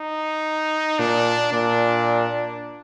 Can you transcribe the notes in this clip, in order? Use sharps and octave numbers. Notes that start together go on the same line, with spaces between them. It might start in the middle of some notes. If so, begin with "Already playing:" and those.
Already playing: D#4
A#2 D4
A#2 D4